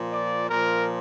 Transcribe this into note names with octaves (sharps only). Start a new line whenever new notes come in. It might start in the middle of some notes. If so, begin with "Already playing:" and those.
Already playing: A#2 F3
D5
A#2 A#4
F3